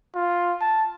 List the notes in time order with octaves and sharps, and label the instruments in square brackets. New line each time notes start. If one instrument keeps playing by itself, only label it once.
[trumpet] F4
A5